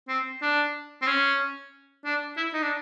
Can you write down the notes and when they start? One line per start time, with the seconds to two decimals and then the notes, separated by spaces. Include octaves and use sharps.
0.08 C4
0.42 D4
1.02 C4
1.07 C#4
2.05 D4
2.37 E4
2.53 D#4
2.62 D4